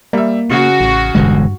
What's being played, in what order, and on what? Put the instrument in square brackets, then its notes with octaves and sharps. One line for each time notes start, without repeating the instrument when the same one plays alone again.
[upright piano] G3 E5 [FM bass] A#3
[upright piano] C#3 [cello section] F#4
[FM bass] A1
[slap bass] E1 D3 G#3 [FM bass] G2